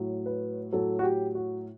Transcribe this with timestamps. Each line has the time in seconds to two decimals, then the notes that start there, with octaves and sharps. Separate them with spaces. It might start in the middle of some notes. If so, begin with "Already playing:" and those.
Already playing: A2 F#3
0.26 B4
0.72 A2 F#3 A4
0.99 F#4
1.03 G4
1.35 F#4